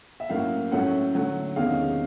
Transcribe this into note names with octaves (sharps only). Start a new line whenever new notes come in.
E5
A2 F#3 A#3 C#4 F5
A2 F#3 A3 C#4 F#5
D3 F#3 A3
E2 C3 D#3 G#3 C#4 F5